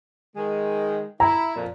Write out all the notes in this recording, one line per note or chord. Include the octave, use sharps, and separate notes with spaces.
D#3 G#3
E4 A#5
F2 A#2